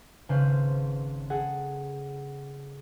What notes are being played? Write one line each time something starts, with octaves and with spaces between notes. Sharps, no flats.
G#1 C#3 B4 C5 F5
G#4 A4 F#5